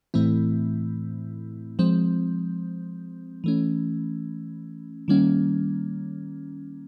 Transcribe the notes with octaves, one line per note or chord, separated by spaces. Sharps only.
A2 E3 A3 C4 E4
F3 G#3 C4
E3 A3 C#4
D#3 G3 A#3 C#4